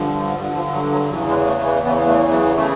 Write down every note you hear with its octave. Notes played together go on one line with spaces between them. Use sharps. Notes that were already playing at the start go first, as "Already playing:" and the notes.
Already playing: G2 D3 F3
G2 D3 F3 G3
F3
F#3
F#3
E2 C#3 E3 F#3
G#3
A3
B3
E2 C#3 E3 B3
A3
F#3
C#3 E3 A3